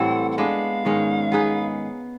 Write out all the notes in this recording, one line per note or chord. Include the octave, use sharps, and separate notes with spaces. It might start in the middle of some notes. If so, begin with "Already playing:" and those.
Already playing: A2 E3 G3 C4 F#5
F#5
G#3 B3 D4 F5
G#2 D#3 G#3 C#4
B3 D#4 G#4 B4